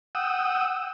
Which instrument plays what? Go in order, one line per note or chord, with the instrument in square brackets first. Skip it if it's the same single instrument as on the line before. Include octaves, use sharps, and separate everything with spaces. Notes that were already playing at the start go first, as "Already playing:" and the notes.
[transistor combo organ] F#5 G5 D#6 E6